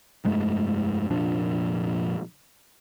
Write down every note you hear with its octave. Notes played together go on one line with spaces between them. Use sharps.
F1 G2 G#3 A3
F1 A#2 F3 D4